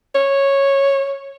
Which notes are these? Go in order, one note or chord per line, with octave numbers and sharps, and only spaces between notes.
C#5